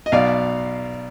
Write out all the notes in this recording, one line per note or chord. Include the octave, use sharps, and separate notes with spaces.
D#5
B1 B2 D5 F5